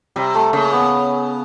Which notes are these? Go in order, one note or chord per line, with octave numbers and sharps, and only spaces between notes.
C3 G3
A3
C#3 A#3
B3